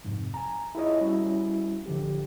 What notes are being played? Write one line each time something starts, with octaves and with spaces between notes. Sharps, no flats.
F2 G#2 C3
G#5 A#5
E4 F4 G#4 C#5 D#5
G3 C#4 E4 F#4
A1 D3 F3 G4